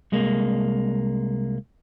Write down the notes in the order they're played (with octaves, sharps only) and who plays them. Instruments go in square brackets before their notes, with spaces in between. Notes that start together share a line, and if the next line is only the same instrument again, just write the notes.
[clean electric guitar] C2 G#3 A#3